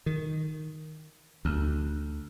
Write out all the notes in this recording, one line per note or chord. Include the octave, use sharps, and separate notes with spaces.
D#3
D2